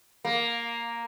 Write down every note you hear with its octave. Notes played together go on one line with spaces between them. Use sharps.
A#3